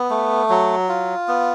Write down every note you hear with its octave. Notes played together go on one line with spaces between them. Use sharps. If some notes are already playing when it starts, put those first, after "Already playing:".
Already playing: B3
A3
F#3
F4
B3